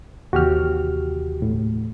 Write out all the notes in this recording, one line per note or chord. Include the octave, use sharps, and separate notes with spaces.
D#2 C3 E3 F#4 G4 F6
A2